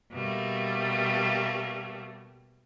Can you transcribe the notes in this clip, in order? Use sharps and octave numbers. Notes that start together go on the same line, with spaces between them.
B2 G3 A3 A#3